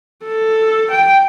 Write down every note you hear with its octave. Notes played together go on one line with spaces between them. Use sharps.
A4
G5